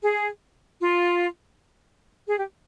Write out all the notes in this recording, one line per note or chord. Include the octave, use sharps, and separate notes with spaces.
G#4
F4
G#4
G4